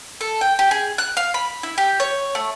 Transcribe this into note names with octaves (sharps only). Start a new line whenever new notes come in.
A4
G5
G4
G#4
F#6
F5
B5
E4
G4
C#5
A3